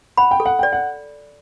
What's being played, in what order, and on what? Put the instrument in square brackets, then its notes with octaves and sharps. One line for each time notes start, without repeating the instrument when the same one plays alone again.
[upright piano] F#5 [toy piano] B5
[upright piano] G5
[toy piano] A4
[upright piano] F#5
[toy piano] D5 [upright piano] G5
[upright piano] F#5